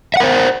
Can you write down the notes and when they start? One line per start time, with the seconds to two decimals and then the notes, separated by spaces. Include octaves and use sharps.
0.14 E5
0.17 F#5
0.20 A#4
0.23 C5